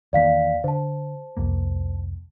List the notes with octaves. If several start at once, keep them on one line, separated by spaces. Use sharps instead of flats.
E2 D#3 A#3 D5 F5 B6
D3 C5 A5
C2 F2 A#3